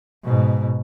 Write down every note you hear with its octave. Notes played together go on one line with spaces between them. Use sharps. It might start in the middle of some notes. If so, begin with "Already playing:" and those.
G#2 B2